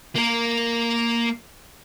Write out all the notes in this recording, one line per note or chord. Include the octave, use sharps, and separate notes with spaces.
A#3 A#4